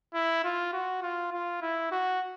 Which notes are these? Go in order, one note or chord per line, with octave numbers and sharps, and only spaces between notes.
E4
F4
F#4
F4
F4
E4
F#4